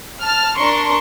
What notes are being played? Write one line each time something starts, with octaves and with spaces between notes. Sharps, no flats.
A5 F6
D4 A#4 C6 C#6